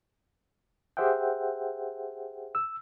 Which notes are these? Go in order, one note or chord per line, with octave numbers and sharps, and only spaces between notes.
G4 G#4 C5 E5 F#5 G5
E6